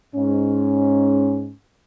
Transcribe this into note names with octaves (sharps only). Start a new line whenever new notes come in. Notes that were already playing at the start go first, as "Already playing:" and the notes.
G#2 C#4